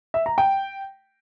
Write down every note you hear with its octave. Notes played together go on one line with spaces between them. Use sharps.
E5
A#5
G5